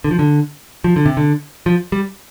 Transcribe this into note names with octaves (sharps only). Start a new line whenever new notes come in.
D3
F3
D3
F3
D3
C3
D3
F3
G3